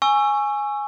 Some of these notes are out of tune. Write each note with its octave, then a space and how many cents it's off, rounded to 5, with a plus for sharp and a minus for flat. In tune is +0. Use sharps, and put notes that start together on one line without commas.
G#5 +0 C#6 +0 E6 +20